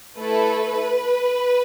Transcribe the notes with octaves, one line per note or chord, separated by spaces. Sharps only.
A3 E4 A4 B4